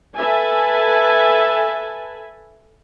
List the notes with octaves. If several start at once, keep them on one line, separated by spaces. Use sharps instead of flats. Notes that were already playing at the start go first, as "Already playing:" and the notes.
A4 B4 E5 G#5 A5